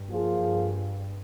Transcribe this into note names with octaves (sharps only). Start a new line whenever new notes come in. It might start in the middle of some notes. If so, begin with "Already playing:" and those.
Already playing: G2
F3 A#3 F4 G#4
G2